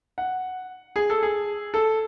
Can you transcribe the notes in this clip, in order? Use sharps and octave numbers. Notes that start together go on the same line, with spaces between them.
F#5
G#4
A4
G#4
A4